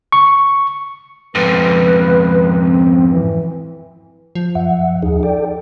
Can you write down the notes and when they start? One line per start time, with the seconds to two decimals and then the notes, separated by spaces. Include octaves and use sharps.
0.12 C#6
1.35 F2 G#2 B4
2.58 C4
3.10 E3
4.35 F3
4.55 F#2 E5 F#5
5.02 D#2 D#4 G#4
5.23 A4 D5 G5